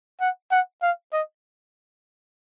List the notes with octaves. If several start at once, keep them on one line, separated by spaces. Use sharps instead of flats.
F#5
F#5
F5
D#5